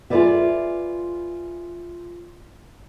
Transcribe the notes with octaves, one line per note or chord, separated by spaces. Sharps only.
F4 G#4 A4 B4 D5 E5